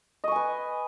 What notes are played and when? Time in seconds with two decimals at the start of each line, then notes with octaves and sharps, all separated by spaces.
0.24 D#5
0.28 C#6
0.32 G#5
0.36 B4